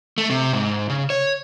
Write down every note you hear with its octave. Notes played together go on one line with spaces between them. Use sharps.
A3
C3
G#2
C#3
C#5